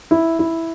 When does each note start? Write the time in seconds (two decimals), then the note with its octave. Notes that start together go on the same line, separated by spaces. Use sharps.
0.11 E4
0.39 E4